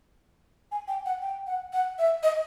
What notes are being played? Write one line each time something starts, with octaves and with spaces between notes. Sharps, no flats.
G#5
G5
F#5
G5
F#5
F#5
E5
D#5